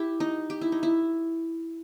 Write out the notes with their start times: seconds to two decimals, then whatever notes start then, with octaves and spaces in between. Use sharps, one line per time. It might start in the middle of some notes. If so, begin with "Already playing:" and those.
Already playing: E4 G4
0.20 D#4
0.50 G4
0.61 E4
0.72 D#4
0.83 E4